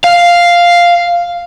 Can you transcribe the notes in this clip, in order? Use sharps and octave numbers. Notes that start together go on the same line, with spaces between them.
F5